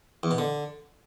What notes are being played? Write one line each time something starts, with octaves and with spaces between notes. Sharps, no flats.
E2
B2
D3